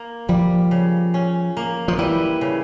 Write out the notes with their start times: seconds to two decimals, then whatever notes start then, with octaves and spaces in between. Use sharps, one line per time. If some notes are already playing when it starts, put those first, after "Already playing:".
Already playing: A#3
0.29 F3 G3
0.71 C#3
1.14 C#4
1.57 A#3
1.88 F3
1.99 E3 G3
2.41 C#3